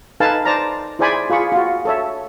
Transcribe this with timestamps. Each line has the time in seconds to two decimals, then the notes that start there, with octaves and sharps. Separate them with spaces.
0.20 D#4 A4 B4 F5 G#5 A5
0.45 C5 D5 A5 A#5
0.99 E4 G#4 C5 D5 G#5 B5
1.30 F4 G#4 B5 C#6
1.52 F4 F#4
1.85 A4 C#5 E5